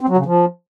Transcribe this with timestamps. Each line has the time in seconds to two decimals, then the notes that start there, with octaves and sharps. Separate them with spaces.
0.01 C4
0.09 F#3
0.17 C#3
0.26 F3